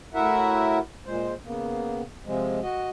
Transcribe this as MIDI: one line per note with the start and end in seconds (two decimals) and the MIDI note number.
0.14 0.79 45
0.14 0.79 64
0.14 0.79 66
0.14 0.79 70
0.14 0.79 76
0.14 0.79 78
1.06 1.34 46
1.06 1.34 56
1.06 1.34 72
1.45 2.02 49
1.45 2.02 58
1.45 2.02 59
2.26 2.60 48
2.26 2.60 53
2.26 2.60 56
2.62 2.90 66
2.62 2.90 75